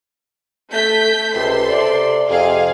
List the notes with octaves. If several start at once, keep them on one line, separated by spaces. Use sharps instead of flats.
A3 G6 B6
C#2 C3 A4 C6
C3 D5
F2 C3 G#4 F5